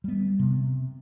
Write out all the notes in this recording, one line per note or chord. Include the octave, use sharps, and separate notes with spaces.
G3 B3
C3